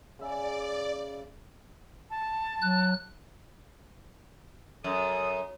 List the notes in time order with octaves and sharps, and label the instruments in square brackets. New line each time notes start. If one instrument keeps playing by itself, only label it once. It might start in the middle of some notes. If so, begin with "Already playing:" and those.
[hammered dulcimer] C#3 E5 [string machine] D5
[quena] A5
[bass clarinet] F#3 [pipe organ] F#6
[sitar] F#2 [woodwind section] A4 D#6